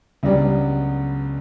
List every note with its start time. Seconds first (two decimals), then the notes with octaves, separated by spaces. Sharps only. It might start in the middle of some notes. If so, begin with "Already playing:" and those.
0.23 C#2 C#3 F#3 G3 B3 D4